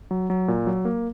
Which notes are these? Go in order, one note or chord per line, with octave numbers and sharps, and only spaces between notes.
F#3
F#3
A#2
F#3
A#3